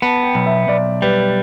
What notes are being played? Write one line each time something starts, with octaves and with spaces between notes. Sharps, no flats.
B3 A5
G5
B1
E5
B1 D5
G3 B4